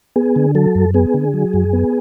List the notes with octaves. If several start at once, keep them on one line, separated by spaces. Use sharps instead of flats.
B3 G#4
D3
F#3 A4
F#2
B3 G#4
D3
F#3
F#2
B3